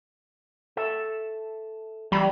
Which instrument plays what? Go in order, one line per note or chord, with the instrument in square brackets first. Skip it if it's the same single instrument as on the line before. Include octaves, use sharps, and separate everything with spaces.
[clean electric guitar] A4 E5
[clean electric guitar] E3 A#5 B5 [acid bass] G3